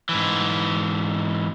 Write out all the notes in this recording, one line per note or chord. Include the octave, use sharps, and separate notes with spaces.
G#2 E3